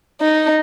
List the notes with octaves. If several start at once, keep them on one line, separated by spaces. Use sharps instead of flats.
D#4